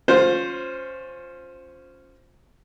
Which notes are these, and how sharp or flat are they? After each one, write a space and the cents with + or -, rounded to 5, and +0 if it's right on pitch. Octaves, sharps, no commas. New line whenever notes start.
C#4 +0 F4 +20 C5 +0